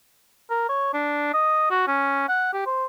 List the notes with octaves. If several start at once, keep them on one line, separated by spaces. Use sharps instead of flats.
A#4
C#5
D4
D#5
F#4
C#4
F#5
G4
C5